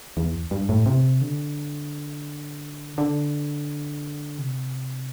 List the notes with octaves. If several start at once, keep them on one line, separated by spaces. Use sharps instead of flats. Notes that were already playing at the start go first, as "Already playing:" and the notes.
E2
G2
A2
C3
D3
D3
C3